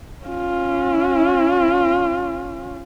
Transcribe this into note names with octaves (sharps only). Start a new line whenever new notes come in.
C#4 F4